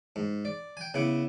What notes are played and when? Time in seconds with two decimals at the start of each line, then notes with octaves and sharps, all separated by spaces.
0.16 G#2
0.45 D5
0.77 G5 G#5
0.94 C#3 B3 E4 D6